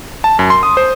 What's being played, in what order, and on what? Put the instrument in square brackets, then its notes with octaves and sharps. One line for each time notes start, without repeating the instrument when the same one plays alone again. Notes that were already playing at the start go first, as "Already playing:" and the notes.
[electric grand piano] A5
F#2
C6
D#6
C5